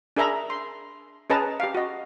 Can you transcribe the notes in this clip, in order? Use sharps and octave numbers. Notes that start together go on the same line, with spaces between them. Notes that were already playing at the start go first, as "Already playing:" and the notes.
D4 G#4 A#4 E5 A#5 B5
C6
C#4 G#4 B4 D#5 A5 A#5
G4 F5
F#4 D#5